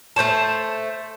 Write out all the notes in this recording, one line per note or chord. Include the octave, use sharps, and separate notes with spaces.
A3 C5 C#5 A5